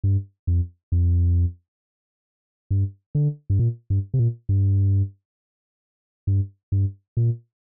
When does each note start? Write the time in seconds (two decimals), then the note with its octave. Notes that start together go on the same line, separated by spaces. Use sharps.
0.04 G2
0.47 F2
0.92 F2
2.71 G2
3.15 D3
3.50 G2
3.59 A#2
3.90 G2
4.14 C3
4.19 A#2
4.49 G2
6.27 G2
6.72 G2
7.17 A#2